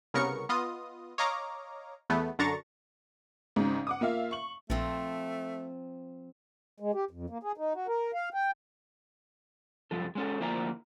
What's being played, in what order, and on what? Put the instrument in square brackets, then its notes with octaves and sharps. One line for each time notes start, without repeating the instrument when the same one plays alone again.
[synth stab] C2 C#3 B3 A#4 C#6 C#7
B3 F4 D#5 D#6
C#5 D#5 F5 A#5 D6
E2 A3 B3
F#2 D3 D4 A#5 C#6 A6
[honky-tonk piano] G#1 G#2 C#3
F#5 D6 D#6
A#3 F4 E5 F5
C#6 F#7
[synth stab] A#1 [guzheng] F3 C4 [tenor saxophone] A3
[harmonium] G#3
G4
F2
A#3
G#4
D#4
F#4
A#4
F5
G5
[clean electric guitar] C2 F#2 F3 A4
G#3 C#4 A4
D2 F3 A#3 E4 D5 A#5